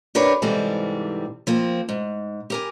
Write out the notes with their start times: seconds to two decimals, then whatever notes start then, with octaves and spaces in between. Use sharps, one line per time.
0.15 D4 G4 A#4 B4 C#5 D5
0.42 G#2 C3 E3 G3 C4 A4
1.47 F3 A#3 C4
1.89 G#2
2.50 G4 A#4 G#5